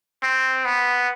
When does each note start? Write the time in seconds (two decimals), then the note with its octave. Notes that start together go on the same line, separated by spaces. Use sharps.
0.23 C4
0.65 B3